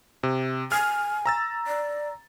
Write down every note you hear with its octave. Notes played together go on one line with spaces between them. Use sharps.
C3
G#5 F6
A#5 E6 A6
D5